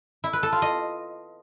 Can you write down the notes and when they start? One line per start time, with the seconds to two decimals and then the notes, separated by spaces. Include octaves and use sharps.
0.24 E4
0.33 B4
0.43 A4
0.52 F4
0.62 D#5